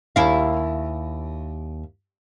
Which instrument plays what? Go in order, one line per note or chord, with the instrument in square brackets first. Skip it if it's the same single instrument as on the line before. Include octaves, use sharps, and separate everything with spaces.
[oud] D#2 E4 F5